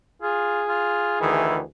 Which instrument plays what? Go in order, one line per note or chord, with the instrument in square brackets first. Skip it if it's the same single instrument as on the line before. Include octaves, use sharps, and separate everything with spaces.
[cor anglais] F4 [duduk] G#4
[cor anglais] F4
[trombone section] D2 D#3 E3 [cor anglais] E4